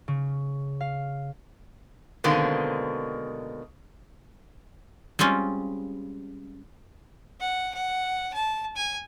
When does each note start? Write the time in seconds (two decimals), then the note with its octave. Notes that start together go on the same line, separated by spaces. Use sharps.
0.08 C#3
0.81 F5
2.24 B2 D3 D#3 G#3 A#3 C4
5.19 G3 G#3 C4 C#4 F4
7.40 F#5
7.74 F#5
8.34 A5
8.76 G#5